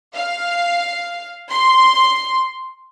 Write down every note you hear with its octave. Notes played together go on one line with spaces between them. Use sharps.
F5
C6